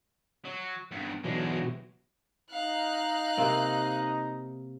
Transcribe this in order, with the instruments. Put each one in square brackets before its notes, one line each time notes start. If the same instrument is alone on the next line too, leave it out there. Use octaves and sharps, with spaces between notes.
[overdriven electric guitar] F#3
E2 G2
[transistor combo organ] B2 E3 F#3 [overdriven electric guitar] G#3 D4
[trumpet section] D#4 D#5 A#5 [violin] F5 F#6
[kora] C3 A#3 C4